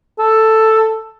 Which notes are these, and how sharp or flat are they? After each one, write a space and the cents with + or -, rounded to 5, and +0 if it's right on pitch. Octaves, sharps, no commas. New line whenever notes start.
A4 +5